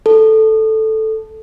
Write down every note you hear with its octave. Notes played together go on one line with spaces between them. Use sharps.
A4